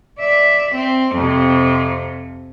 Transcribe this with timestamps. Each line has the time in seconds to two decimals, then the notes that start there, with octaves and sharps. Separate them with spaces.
0.20 D5 E5
0.74 C4
1.15 F2 C3